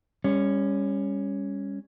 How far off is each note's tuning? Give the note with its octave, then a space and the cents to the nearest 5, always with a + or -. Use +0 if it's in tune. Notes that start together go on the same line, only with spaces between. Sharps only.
G3 +35 C#4 +0